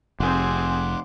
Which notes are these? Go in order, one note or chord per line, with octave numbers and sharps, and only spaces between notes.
F1 C4 G#4 F#5 C6 D6